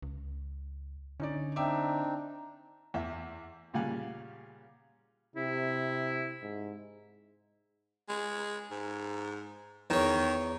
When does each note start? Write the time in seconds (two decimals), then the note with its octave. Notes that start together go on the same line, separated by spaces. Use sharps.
0.02 C#2
1.20 D3 C#4 D#4 D5
1.56 C4 D4 D#4 E5 G5 D6
2.94 E2 E5
3.74 A#2 C#3 G3 F5 F#5 G#5
5.36 C3 E4
6.42 G#2
8.09 G#3
8.71 G#2
9.90 E2 D#3 C#5